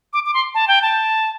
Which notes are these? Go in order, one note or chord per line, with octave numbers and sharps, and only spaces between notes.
D6
D6
C6
A5
G5
A5